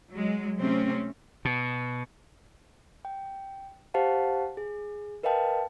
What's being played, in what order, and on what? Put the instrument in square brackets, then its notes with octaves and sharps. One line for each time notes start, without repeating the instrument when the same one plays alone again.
[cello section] F#3 G#3
C3 A3 C4 C#4
[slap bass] B2
[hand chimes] G5
G4 C5 F5 F#5 A5
G#4
A#4 B4 D#5 F5 G5 A5